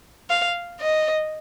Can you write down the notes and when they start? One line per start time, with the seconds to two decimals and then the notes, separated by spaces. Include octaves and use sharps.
0.30 F5
0.80 D#5